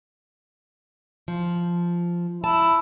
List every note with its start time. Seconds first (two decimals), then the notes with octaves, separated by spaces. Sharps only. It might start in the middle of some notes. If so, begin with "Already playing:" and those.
1.28 F3
2.44 E4 A5